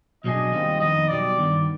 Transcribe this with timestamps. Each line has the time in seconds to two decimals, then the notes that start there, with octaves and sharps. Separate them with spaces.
0.24 B1 B2 G#3 D4 G#4 D#5
0.53 D#2 D#3 G3 C4 F4
0.80 F2 D#3 B3 D#4 D#5
1.08 B1 B2 G3 D5
1.37 G2 D#3 B3